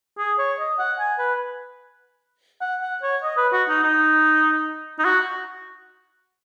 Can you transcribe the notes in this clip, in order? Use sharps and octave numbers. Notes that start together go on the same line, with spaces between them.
G#4
C#5
D#5
F#5
G#5
B4
F#5
F#5
C#5
D#5
B4
F#4
D#4
D#4
D#4
F#4